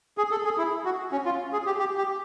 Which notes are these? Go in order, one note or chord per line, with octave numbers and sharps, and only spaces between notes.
G#4
A4
G#4
E4
F#4
C#4
F4
G#4
G4
G4
G4